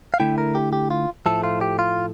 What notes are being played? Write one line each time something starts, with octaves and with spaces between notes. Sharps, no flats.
F5
D3 A3 E4 G5
A#4
G4
G4
F4
A2 F3 A3 A4
F4
G4
F4